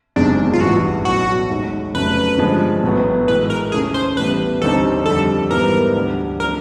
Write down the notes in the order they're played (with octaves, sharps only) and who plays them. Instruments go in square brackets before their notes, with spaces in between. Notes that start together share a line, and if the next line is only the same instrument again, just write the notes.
[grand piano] F#1 E2 C3 D#3 G#3 [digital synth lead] D4
[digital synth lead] F4
[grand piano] A1 G2 E3 [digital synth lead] F#4
[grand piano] B1 A2 E3 [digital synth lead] F#4
[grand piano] D#2 D#3 G#3
[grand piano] F1 F2 C#3 F#3 A3 [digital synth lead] B4
[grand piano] G2 D3 F3 G#3
A1 A2 F#3 B3
[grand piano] A2 E3 G#3 [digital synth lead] B4
[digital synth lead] A#4
[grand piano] D#2 C#3 E3 A3 C#4 [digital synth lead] G#4
[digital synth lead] C5
[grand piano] A1 A2 E3 G3 B3 [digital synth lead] B4
[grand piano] D#2 D3 G3 C4 D#4 [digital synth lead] A4
[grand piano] F2 D3 G3 [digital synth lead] A4
[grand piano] G#2 E3 G3 B3 [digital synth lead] A#4
[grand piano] D2 D3 G3
[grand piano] F3 A3 D4 [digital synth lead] A#4